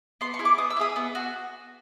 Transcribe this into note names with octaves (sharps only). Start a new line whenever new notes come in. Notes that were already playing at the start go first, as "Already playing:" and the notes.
B3 C6
C#6
E4 G#4
D6
B3 D#6
E6
E4 G#4 D#6
B3
F#4